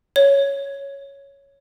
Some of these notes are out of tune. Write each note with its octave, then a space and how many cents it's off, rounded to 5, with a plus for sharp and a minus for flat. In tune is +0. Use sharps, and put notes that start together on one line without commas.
C#5 +0